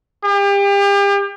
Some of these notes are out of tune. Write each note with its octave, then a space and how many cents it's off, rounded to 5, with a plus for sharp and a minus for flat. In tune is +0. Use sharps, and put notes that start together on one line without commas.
G4 +35